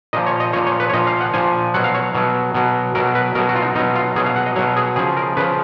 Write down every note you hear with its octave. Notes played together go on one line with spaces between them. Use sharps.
A#2 F3 D#5
C#5
D#5
A#2 F3 C#5
C#5
B4
C#5
A#2 F3 D#5
F5
F#5
A#2 F3 G#5
B2 F#3 F#5
F5
C#5
B2 F#3
B2 F#3
B2 F#3 A#4
B4
B2 F#3 A#4
F#4
F4
D#4
B2 F#3 D#4
F4
B2 F#3 G#4
F5
F#5
D#5
B2 F#3 C#5
G#4
C#3 F3 G#4
A#4
C#3 F3 B4